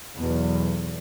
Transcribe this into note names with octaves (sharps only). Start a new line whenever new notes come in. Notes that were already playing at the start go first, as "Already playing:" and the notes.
B1 E2 B2